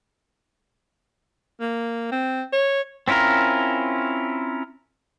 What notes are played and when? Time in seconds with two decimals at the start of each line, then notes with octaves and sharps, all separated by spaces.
1.61 A#3
2.12 C4
2.53 C#5
3.08 C4 C#4 E4 F4 A#4